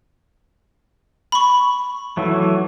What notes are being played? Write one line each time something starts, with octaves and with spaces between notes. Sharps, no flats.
B5 C#6
E3 F#3 A3